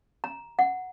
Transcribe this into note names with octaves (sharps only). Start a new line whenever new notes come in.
A#5
F#5